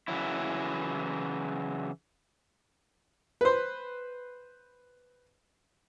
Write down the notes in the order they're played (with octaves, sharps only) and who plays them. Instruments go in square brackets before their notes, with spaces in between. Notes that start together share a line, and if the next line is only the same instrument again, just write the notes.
[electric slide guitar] C#3 E3 F#3 E4
[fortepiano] B4 C5